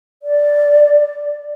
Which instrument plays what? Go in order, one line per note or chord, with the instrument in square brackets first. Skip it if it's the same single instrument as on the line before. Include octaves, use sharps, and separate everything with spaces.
[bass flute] D5